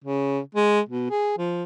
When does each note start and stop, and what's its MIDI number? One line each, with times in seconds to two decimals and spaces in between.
0.04 0.39 49
0.55 0.80 56
0.89 1.10 47
1.10 1.38 68
1.38 1.64 53